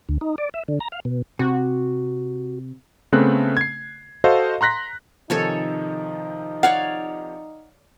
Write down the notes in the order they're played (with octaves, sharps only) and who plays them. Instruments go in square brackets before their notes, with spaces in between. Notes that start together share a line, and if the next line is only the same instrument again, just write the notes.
[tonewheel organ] D2
D#4
D5
E5
D3
A#5
F5
B2
[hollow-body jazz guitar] C3 [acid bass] F#4
[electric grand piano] C#3 A3 B3 C4 F#6
G#6 C7
F#4 A4 C5 D#5 F5
A#5 C6 F#6 A#6 B6
[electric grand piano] C3 D#3 F3 [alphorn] D#4 [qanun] A4 C#5 G#5
[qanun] C#5 D5 F5 [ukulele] F#5